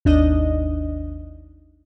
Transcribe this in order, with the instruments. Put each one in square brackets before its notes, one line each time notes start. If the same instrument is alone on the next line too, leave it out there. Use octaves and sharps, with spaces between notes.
[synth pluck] G#1 D#2 D4 D#4 D#5